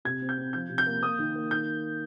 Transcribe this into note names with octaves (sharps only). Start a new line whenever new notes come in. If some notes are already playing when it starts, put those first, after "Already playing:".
C3 G#6
C4
G6
C4
F3 G6
C3
G6
A#3
A#3 D#6
D#3
A#3
D#3 G6